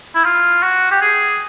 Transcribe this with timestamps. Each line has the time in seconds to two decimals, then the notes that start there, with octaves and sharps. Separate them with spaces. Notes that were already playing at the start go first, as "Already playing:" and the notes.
0.15 E4
0.24 F4
0.63 F#4
0.91 G4
1.01 G#4